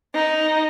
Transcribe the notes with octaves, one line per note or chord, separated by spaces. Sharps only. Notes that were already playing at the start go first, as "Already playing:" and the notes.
D#4